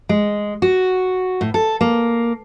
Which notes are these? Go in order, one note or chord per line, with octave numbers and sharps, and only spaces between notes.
G#3
F#4
A2
A4
A#3